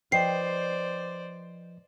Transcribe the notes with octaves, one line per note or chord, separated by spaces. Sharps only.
F3 B4 C5 D5 D#5 G5 C7